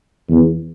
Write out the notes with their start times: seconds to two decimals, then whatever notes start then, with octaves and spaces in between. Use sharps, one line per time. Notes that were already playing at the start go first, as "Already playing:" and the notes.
0.30 E2